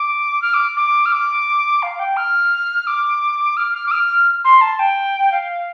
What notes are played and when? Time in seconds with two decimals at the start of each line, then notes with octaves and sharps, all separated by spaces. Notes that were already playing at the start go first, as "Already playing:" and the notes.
Already playing: D6
0.42 F6
0.54 D6
0.77 D6
1.06 F6
1.12 D6
1.83 F5
1.99 G5
2.17 F6
2.87 D6
3.57 F6
3.74 F6
3.86 D6
3.91 F6
4.44 C6
4.61 A5
4.79 G5
5.32 F5